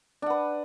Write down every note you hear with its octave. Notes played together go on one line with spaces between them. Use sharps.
D4 B4 F#5